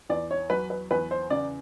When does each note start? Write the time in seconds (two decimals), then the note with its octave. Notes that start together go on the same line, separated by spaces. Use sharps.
0.10 E2 D5
0.31 C#5
0.50 F#3 B4
0.70 B4
0.91 E2 B4
1.11 C5
1.30 C#3 D5